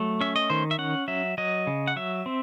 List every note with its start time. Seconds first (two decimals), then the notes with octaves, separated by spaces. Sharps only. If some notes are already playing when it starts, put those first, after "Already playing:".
Already playing: F#3 A3
0.21 C#4 E5
0.36 D#5
0.50 D#3 C5
0.71 E5
0.78 C#4 F#5
1.08 F#3 E5
1.38 F#3 D#5
1.67 C#3
1.87 F#5
1.96 F#3 E5
2.26 C4